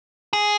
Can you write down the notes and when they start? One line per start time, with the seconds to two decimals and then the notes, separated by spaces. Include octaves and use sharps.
0.33 G#4